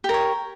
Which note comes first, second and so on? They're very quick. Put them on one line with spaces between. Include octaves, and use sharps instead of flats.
G4 A#4 C#5